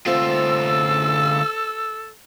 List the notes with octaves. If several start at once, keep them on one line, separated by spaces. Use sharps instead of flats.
D2 C4 F4 A4 C5 E5 E6